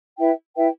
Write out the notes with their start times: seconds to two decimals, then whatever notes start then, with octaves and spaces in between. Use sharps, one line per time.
0.19 E4 B4 E5 G5
0.55 E4 B4 E5 G5